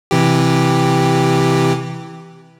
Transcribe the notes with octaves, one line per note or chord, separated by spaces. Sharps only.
C3 E3 G4